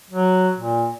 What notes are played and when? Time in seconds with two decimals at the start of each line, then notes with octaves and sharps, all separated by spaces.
0.10 F#3
0.58 A#2